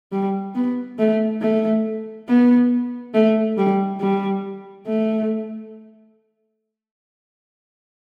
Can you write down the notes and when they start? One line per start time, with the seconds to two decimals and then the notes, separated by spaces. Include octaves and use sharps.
0.12 G3
0.55 B3
0.99 A3
1.42 A3
2.28 B3
3.14 A3
3.57 G3
4.00 G3
4.87 A3